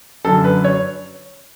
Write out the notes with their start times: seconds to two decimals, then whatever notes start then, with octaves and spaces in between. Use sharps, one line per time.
0.25 F#2 D3 F#3 A4
0.44 B4
0.64 C#5